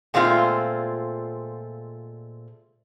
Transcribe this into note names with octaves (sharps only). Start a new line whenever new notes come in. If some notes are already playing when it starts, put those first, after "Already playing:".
A#2 G#3 A3 C4 F4